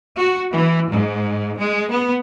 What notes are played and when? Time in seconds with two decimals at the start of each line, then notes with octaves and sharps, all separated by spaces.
0.17 F#4
0.52 E3
0.88 G#2
1.58 G#3
1.89 B3